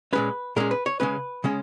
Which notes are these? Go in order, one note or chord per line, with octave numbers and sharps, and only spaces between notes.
A#2 G#3 C#4 B4
A#2 G#3 C#4 A#4
B4
C#5
C#3 G#3 C#4 B4
C#3 G#3 C#4